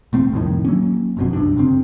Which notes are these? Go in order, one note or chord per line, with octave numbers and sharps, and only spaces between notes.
E1 A3 C4
C2 F2 A2 D#3
F#3 A#3 C#4
G1 F2 B2
F#1 C2 G2 D4
G2 C#3 C4